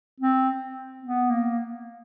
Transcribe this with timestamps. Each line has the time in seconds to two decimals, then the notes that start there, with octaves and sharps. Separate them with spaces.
0.20 C4
1.03 B3
1.30 A#3